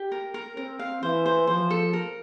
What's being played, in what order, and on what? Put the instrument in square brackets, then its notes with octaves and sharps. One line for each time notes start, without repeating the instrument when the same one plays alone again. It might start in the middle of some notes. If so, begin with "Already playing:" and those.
Already playing: [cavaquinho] G4
A#4
A#4
[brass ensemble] C4 [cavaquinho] A#4
[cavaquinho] F5
[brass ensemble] E3 [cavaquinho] C5
[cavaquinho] C5
[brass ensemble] F3 [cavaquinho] C5
[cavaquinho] A4
A#4